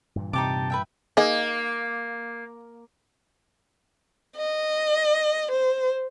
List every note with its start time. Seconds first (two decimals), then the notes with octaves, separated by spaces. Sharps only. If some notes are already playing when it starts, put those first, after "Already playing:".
0.16 G2 A#2 E3
0.33 C3 D#4 G4 A5 D6
0.70 B4 E5 G5
1.17 A#3 D#4 G#4 D#5
4.37 D#5
5.51 C5